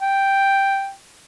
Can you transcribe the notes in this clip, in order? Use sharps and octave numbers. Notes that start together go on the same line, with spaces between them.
G5